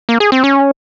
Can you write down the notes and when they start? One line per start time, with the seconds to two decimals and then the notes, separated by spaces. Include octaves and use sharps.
0.09 A#3
0.20 G#4
0.32 C4
0.44 C#4